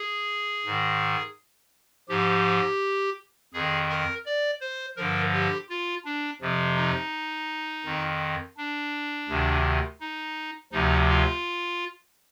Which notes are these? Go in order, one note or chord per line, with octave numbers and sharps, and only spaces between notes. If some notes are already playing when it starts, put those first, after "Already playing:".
Already playing: G#4
G#2 D#3
G#2 F3 G4
F2 D#3 G#4
A#4
D5
C5
G2 D3 F3 A#4
G4
F4
D4
F2 C3 F3
D#4
F2 D#3
D4
D2 C3 D#3
D#4
D2 C3 F3 D#4
F4